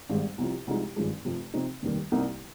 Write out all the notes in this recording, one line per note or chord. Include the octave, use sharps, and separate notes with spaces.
G#1 G#2 G3
C2 C3 F3
C2 C3 F3 G#3 D#4
G#1 G2 F3 G#3
F1 F2 C3
C3 F3 C4 D#4
F1 D#2 D#3 G3
C2 C3 G3 A#3 D#4